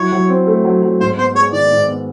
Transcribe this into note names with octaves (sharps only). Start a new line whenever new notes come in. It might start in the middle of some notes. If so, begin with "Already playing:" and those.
Already playing: F#3 E4 C#5
F#3
C4
A3
F#3
F#3
G#2 C5
B3 C5
G#3 C#5
D#3 D5
G#2
B3